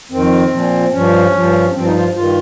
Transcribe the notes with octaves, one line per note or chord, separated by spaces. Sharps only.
F2 D#3 C4
A#2 F3
G2 F3 C#4
G2 F3
G2 F3 C4
D#4
F4
G2 D#3 F4